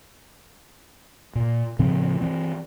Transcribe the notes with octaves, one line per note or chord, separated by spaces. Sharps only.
A#2
A2 C#3 F3 C4
E3 C4